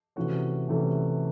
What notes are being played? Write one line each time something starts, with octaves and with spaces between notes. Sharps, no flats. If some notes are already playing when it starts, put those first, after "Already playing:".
C3 E3 A3 C#4 F#4
C3 E3 A3 C#4